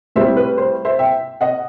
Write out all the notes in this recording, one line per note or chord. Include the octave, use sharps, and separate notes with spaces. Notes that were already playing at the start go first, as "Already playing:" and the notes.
A2 G3 C4 C5 E5
B4
C5
C5 E5
E5 G5
D#5 F#5